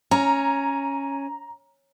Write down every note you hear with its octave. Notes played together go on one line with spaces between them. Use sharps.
C#4 A#5